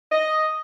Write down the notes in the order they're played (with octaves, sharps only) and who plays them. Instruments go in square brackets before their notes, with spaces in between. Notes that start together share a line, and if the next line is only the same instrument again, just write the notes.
[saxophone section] D#5